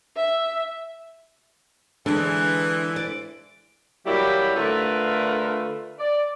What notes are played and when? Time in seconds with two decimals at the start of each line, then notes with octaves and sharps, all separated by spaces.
0.16 E5
2.06 D3 E3 G#3 D4
2.96 D5
4.06 F#3 G3 A#3 E4 G4
4.55 D3 A3 F4 A#4 B4
5.99 D5